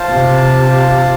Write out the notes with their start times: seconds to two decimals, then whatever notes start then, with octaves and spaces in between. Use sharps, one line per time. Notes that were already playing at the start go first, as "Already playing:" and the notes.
Already playing: F4 C5 F5 A5
0.11 C3